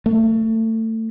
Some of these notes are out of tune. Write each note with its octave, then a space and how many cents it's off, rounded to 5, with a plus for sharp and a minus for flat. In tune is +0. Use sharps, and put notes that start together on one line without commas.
A3 +25